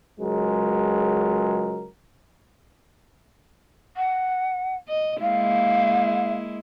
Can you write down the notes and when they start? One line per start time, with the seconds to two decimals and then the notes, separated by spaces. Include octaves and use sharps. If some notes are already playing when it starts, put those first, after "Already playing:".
0.20 C#2 F#3 G#3 A#4
3.97 F#5
4.89 D#5
5.21 G#3 A#3 E4 F5